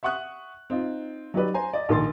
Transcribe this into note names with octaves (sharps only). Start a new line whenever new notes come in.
E5 F#5 C#6 D#6 F#6
C4 D#4 F4
F#3 D#4 G4 B4 D5
C5 G#5 A#5
D5 D#5
A#1 D#3 C6 A6